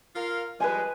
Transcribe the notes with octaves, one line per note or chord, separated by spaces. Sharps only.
F4 A#4 F5
F3 G3 G#3 B4 G#5